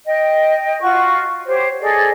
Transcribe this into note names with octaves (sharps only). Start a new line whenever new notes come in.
D#5 G5
F4 F#4 C#6
G4 C5 C#5
G#4 A4 D5 D#5